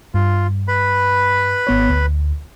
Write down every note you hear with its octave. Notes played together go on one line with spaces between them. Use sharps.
G2 F4
B4 B5
G#1 B3 C#5
D2